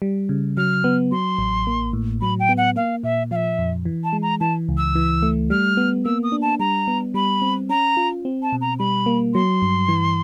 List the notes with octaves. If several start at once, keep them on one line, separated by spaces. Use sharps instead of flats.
G3
C#3
F#3 F6
B3
F#3 C6
A1
A#3
A2
F#3 B5
G5
B3
F#5
A#3 F5
A#2 E5
F3 E5 F5
F2
E3
A5
G#3
A#5
E3 A5
C#2
E6
E3
A3
G3 F6
B3
A#3 E6
D#6
D4
A5
G3 A#5
B3
G3 B5
C4
C#4 A#5
F4
C4
A5
B2
A#5
G3 B5
A#3
F#3 C6
G2
E3